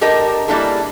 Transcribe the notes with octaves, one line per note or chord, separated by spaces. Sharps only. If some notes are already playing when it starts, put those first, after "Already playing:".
D4 G4 A4 A#4 D#5
G3 A#3 D4 E4 G#4 A4